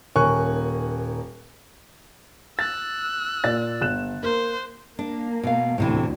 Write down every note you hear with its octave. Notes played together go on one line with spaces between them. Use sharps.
D#1 A#4 C#5 G#5 C#6 F#6
E6 F#6 A6
A#2 D5 A6
G1 F#6 E7
A#3 C5
A#3 D4
B2 F5
D2 A2 C3 E3